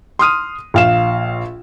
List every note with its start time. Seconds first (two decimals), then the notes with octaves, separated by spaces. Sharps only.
0.19 C6 D#6 F6 D#7
0.74 A#1 F5 E7